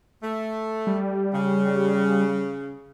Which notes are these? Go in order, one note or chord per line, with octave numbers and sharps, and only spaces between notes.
A3
G3
C#3